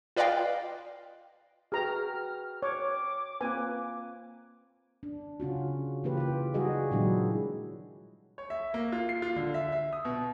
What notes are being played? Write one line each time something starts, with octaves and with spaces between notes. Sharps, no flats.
F4 B4 D5 D#5 F5 G5
F#4 G#4 B4 G5 A#5 F6
C#5 D6
A#3 C4 F4 B4 G#5
D4
C#3 C#4 F4 F#4
C#3 E3 A#3 F4 G4 B4
F4 G4
G3 D#4 F#4 G#4 D#5
A#2 D#3 F#3 G#3 D4 E4
C#5
E5
A#3
F4
C7
F4
D3
E5
E5
D#6
B2